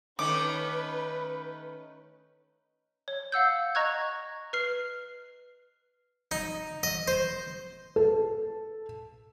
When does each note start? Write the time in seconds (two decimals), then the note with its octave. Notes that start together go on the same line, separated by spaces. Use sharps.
0.19 D#3 A3 C#4 B4 D6
3.08 C#5
3.32 F5 F#5 E6 G6
3.75 D#5 A#5 C#6 F#6 G#6
4.53 B4 F6 C7
6.31 D#4
6.83 D#5
7.08 C5
7.96 A4